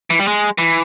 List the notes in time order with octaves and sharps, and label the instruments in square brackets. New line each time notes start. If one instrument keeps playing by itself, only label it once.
[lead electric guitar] E3
G3
G#3
E3